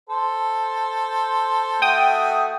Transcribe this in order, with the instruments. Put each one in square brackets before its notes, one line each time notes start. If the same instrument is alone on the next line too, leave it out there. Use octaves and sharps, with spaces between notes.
[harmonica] A4 C5
[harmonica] A3 F#4 [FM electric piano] G5 D#6